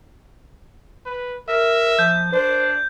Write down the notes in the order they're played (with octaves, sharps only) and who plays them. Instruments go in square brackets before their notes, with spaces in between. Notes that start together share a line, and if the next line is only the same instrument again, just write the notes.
[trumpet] B4
[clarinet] A#4 [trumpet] E5
[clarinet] F3 [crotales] G6
[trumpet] D4 [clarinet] C5